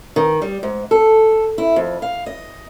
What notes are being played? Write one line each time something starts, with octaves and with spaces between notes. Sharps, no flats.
D#3
G3
G#2
A4
E4
F2
F5
D#5